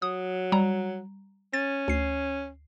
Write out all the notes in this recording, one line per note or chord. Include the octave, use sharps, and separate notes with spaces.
F#3 D#6
G3 A#5
C#4 A6
D2 C7